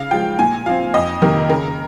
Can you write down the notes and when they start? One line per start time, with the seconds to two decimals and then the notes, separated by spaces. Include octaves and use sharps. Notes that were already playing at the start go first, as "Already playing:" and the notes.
Already playing: C#3 F5
0.11 F3 G#3 G5
0.39 A#2 G#5
0.66 F3 C4 F5
0.94 F2 D#5
1.22 C3 D#3 A#3 A#4
1.49 C#3 A#4